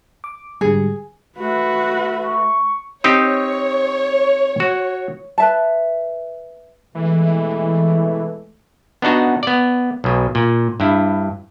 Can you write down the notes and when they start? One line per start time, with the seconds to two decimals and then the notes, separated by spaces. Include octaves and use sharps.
0.24 D6
0.61 G#2 D3 G3 G#4
1.38 A3 F#4 B4
2.25 C#6
3.04 C4 D#4 G4 C#5
4.60 F#4
5.38 B4 E5 A5
6.95 B2 E3 G#3 A3
9.02 B3 D4 D#4 F#4
9.43 B3 D5
10.04 B1 B2
10.35 A#2
10.80 G2 E4